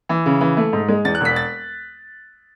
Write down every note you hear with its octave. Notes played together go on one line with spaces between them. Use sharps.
E3
C#3
E3
A3
G#2
G#3
E2 A6
F#6
E1 B6
A6